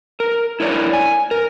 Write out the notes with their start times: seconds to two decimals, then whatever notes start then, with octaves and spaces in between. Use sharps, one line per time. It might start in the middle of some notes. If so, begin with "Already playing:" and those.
0.20 A#4
0.60 E4 A#4 C#5 D5
0.93 G#5
1.31 A#4